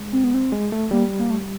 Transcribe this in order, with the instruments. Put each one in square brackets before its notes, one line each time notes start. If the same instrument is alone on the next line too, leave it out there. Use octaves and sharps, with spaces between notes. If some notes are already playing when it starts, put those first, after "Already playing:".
Already playing: [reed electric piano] G#3
[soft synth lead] C4
B3
C4
[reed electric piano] G#3
A3
[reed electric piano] G3 [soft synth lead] A#3
[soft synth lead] A#3
A3